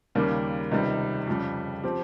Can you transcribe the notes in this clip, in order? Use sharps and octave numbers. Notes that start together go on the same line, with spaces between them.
D#2 C#3 G3 A#3
C#2 C3 D#3 G3
F2 C#3 G3
F3 C4 G4